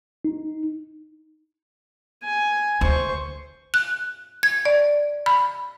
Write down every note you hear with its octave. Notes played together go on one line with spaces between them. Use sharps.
D#4
G#5
D2 C5 C#6
F#6
G#6
D5
B5